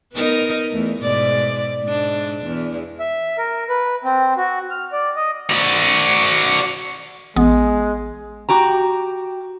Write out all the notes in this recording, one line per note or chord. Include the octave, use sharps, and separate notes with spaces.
B3 D#4 A#4
E2 A3
G#2 B2 D5
G#2 D4
E2
E5
A#4
B4
C4
F#4
F6
D5
D#5
F#4 D5
A1 G#3 B3
F#4 G4 A#5